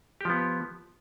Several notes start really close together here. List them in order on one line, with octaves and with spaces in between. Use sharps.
G4 F3 B3